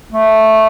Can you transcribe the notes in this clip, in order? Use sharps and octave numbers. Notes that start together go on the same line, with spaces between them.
A3